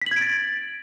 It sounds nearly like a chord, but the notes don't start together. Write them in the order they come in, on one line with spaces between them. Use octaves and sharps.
B6 F#7 G#6 D7 A6